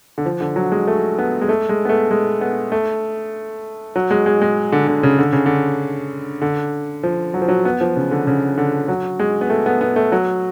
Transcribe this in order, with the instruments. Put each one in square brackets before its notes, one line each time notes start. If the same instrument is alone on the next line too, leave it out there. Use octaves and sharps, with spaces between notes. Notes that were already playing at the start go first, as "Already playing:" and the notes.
[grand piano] D3
F3
D3
F#3
G#3
A3
B3
G#3
A3
G#3
B3
A3
G#3
B3
A3
F#3
G#3
G#3
G#3
D3
D3
C#3
D3
C#3
D3
D3
F3
F#3
F3
F#3
B3
F3
C#3
D3
C#3
D3
F#3
G#3
B3
A3
B3
B3
A3
F#3